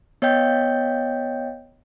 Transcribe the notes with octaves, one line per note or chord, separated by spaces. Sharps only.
B3 C#5 D#5 F5 G5 G6